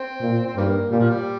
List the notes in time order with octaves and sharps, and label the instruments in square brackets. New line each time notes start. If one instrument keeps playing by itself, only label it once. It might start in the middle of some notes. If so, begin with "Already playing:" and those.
Already playing: [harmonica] C4
[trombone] A#2
[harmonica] C4
[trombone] G2 [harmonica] D#3 G3 A#3
[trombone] A#2 [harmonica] G3
[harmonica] F3
G3